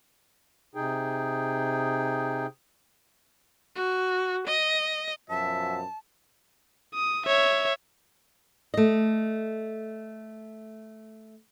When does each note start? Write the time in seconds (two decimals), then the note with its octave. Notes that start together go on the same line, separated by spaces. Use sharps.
0.75 C3 D#4 G#4 G5
3.75 F#4
4.47 D#5
5.30 F#2 B2 F3 E5 A5
6.94 D#6
7.26 C#5 E5
8.74 A3 D#5